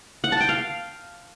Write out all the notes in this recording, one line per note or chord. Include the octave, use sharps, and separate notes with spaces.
F#5
A5
G5
F5